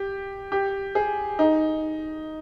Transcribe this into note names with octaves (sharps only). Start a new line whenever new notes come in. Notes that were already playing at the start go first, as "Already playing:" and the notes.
Already playing: G4
G4
G#4
D#4